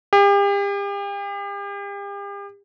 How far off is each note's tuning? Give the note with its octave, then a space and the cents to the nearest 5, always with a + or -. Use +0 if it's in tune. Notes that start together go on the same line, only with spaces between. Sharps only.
G4 +40